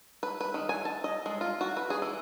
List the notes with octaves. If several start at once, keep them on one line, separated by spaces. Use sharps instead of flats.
B4
B4
D#3
G#5
A5
D#5
G#3
F4
F#4
B4
G#4
E3